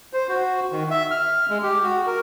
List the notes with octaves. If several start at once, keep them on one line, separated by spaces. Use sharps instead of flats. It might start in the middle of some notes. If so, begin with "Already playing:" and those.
C5
F#4
D#3
E5
F6
G#3
G4
F#4
A#4